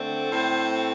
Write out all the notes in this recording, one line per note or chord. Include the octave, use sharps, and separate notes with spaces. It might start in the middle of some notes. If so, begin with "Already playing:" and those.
Already playing: D3 A3 C4
A2 A3 C4 C5